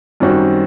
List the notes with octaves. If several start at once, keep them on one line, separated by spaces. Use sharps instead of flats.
F#2 D#3 G3 C4 F#4